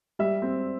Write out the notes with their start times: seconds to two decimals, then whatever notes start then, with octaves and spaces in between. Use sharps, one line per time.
0.19 G3 E5
0.42 C4